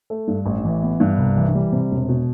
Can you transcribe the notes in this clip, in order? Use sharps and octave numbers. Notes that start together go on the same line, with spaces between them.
A3
G2
A1
E3
B3
G2
C2
E3
G3
C3
E1
B2